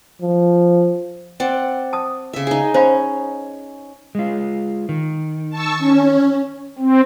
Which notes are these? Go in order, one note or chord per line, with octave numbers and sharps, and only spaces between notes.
F3
C4 D5 F#5
A5 D#6
C#3 E5
D#4 G#4
C#4 C5 F5 B5
G#3 F4
D#3
A5 C#6 E6
C#4
C4